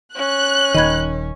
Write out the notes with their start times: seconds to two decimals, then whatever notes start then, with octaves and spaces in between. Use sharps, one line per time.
0.15 C#4 F#6
0.74 D#1 D#3 D#5 B5 G#6